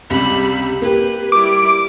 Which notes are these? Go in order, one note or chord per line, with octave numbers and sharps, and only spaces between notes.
C#2 C3 G3 B5
A#3 G4 B4
G3 E4 D6